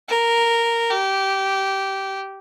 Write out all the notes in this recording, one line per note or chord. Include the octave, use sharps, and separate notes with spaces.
A#4
G4